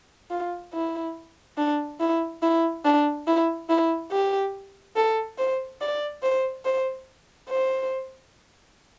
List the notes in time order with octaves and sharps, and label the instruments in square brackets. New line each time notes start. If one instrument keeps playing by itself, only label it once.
[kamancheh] F4
E4
D4
E4
E4
D4
E4
E4
G4
A4
C5
D5
C5
C5
C5